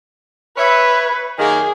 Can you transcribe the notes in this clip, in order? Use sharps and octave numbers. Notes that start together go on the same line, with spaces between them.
B4 C#5 E5
F#2 D#3 A#3 G#4